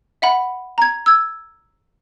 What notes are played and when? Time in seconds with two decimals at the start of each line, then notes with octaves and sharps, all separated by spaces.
0.22 E5 F#5 B5
0.78 A#5 G#6
1.06 E6 G#6